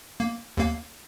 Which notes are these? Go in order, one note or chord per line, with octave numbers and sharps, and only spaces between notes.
A#3
D#2 A#3 F5